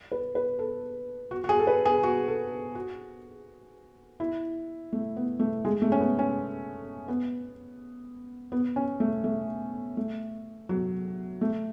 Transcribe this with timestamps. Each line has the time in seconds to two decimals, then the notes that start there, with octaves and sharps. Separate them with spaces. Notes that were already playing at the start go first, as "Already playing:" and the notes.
0.12 B4
0.35 B4
0.59 A4
1.31 F#4
1.44 F#4
1.49 G#4
1.59 A4
1.67 B4
1.85 G#4
2.03 F#4
2.28 A4
2.75 F#4
4.20 E4
4.93 A3
5.17 B3
5.39 A3
5.65 G#3
5.82 A3
5.92 C#4
6.00 B3
6.19 C#4
7.08 B3
8.52 B3
8.76 C#4
9.00 A3
9.24 A3
9.97 A3
10.69 F#3
11.41 A3